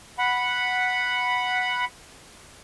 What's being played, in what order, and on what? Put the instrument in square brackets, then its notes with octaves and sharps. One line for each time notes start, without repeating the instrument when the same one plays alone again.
[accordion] F#5 B5